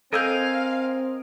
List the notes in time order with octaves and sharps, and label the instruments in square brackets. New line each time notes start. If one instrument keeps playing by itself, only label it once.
[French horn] C4 [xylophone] A4 E6 G6 [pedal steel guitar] A#4 D#5 G#5 [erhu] F5